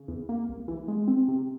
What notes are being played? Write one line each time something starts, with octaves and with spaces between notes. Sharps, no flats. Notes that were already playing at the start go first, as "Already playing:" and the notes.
Already playing: C#3
E2
A#3
C2
E3
G#3
C4
C3